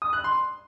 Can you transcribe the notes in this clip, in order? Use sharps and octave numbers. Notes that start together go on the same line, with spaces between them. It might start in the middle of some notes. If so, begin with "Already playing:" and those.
D#6
F#6
C6